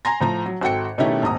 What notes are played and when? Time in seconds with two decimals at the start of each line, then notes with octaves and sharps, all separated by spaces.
0.05 G#5 A#5 C6 A#6
0.20 A2 F3 A#5
0.46 F#3
0.61 G#1 F#4 A4 G5 C#7
0.98 B2 D#3 A3 C#4 E4 G4
1.22 D#1 G#1 A#5 D#6